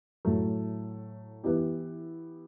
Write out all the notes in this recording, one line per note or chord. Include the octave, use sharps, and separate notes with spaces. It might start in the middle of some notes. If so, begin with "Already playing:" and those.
A2 F#3 A3
E3 B3 E4 G4